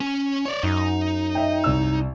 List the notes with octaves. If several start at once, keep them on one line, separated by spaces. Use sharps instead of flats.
C#4
C#5 D5
F#2 D#4
D#5 E5 G5
C2 E6